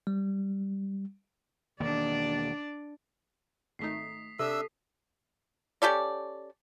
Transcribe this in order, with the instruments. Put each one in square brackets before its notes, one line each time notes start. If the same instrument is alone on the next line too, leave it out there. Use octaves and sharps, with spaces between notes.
[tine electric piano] G3
[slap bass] E1 D#3 A#3 [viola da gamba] D4 D5
[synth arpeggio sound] G#1 A3 D#4 [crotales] D#6 B6 C7
[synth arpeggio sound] C3 [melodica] D4 E5 E6 [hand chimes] A4
[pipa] C#4 G4 A4 D5